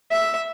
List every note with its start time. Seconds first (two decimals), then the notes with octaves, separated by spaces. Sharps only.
0.12 E5